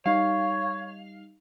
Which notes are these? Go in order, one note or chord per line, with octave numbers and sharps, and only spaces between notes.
G3 D#4 C#5 F5